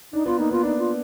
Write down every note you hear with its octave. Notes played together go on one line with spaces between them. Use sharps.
D4 D#4
B3 F4
A#3 D#4
B3 F4
D4 D#4
F4